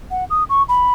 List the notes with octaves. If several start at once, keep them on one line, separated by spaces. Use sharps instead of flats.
F#5
D#6
C#6
B5